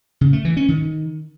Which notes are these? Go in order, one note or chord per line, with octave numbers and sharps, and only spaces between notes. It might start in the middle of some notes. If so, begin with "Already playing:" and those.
C#3
A3
E3
C#4
D#3